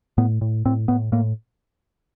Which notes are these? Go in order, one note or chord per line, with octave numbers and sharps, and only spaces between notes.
A2 B3
A2
A2 C4
A2 B3
A2 A#3